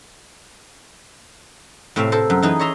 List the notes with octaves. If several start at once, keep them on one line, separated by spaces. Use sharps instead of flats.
A2 C3 C4 E5 F5
A4 A#4 C5
F#2
E3 D#4 G#4 B4
C#5 D#5 E5 A#5 C6